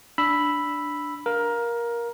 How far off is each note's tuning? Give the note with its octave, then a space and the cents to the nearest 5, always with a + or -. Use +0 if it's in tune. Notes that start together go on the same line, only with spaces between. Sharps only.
D4 +0 B5 +0 E6 +0
A#4 +15 F5 +10